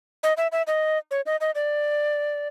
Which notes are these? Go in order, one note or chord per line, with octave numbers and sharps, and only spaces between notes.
D#5
E5
E5
D#5
C#5
D#5
D#5
D5